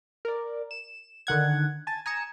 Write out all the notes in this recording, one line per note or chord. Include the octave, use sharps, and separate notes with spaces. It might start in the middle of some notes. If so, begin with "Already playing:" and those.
A#4 D5
E7
D3 D#3 F#5 G#6
G#5 A5 G#6 A6
G#5 A#5 D#6 C#7 E7